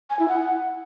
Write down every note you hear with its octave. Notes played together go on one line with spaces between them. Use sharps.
G#5
E4
F#5